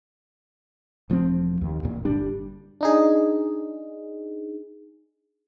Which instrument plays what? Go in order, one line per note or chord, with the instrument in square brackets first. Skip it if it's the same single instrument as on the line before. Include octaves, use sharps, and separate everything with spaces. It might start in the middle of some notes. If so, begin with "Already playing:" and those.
[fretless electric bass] E1 F3 A3 C4
D#2
E1 A#2
G1 G3 D4
[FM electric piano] D4 D#4 G#4